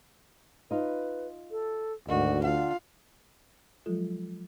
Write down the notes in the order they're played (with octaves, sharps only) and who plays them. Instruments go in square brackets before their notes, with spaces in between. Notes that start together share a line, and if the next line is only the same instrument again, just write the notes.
[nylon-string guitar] D#4 F4 [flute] B4
[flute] A4
[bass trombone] D2 [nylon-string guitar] G#2 D#3 [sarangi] F#4 [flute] D5
[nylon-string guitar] D3 D4 F#5 [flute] F4 [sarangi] F5
[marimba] F3 F#3 G#3 F4 A4